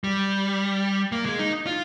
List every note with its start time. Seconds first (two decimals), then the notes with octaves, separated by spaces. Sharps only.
0.04 G3
1.12 A#3
1.26 G#3
1.39 D#4
1.66 F4